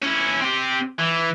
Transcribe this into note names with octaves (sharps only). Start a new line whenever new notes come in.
C#4 E4
C4 G4
E3